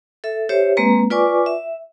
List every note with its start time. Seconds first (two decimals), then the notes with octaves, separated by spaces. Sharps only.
0.24 A4 E5
0.49 G4 C5 C#5 E5
0.77 G#3 A#3 C4 B4 A#5
1.10 F4 B4 D5 G#5 C#6 D6
1.46 E5